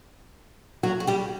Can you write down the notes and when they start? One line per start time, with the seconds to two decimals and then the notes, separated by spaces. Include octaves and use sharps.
0.83 F#3 F#4
1.00 F#4
1.07 G3 G4